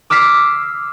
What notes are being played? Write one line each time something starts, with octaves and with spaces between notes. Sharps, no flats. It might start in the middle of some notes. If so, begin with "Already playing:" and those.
D6 E6 F6 B6 C7